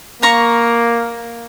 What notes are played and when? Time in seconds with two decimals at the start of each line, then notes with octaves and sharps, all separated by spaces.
0.22 A#3 F5 A#5 C#6